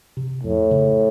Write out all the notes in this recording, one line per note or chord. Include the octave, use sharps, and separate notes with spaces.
C3
F2 A2
C#3